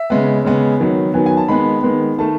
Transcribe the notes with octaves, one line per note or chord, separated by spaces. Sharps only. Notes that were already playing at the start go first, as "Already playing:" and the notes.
Already playing: E5
C#3 G#3 B3
C#3 G#3 B3
D#3 F#3 B3
D#3 F#3 B3 G#5
G#5
A5
D#3 G#3 B3 B5
D#3 G#3 B3
D#3 A3 A5